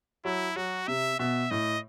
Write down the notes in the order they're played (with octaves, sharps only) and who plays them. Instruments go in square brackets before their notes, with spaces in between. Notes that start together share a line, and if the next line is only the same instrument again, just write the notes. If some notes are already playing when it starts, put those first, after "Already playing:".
[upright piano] F#3 [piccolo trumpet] E4
[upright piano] F#3 [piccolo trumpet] F#4
[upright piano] C3 [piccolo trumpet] E5
[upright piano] B2 [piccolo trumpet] E5
[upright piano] A2 [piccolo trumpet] D#5